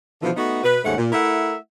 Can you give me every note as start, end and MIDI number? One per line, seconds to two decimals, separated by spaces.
0.22 0.32 47
0.22 0.32 50
0.22 0.32 52
0.22 0.32 53
0.36 0.63 57
0.36 0.63 59
0.36 0.63 63
0.36 0.63 66
0.64 0.80 47
0.64 0.80 71
0.85 0.95 39
0.85 0.95 44
0.85 0.95 57
0.85 0.95 61
0.85 0.95 78
0.98 1.09 46
1.12 1.55 57
1.12 1.55 64
1.12 1.55 70
1.12 1.55 76
1.12 1.55 78